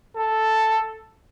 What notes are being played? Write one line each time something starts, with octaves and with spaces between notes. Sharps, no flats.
A4